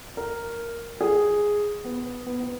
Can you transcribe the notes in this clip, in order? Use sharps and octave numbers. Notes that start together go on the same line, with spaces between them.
A#4
G#4
B3
B3
B3